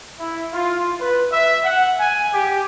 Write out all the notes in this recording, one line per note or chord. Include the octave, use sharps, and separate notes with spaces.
E4
F4
B4
E5
F#5
G#5
G4